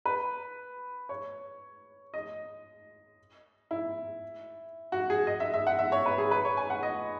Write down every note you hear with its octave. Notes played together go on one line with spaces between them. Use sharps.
B4
C#5
D#5
E4
F#4
G#4
D#5
E5
E5
F#5
E5
C#5
B4
G#4
B4
C#5
G#5
F#5
D#5